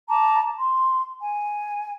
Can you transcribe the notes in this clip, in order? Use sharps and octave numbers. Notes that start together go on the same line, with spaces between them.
A5 A#5 D6
C6
G#5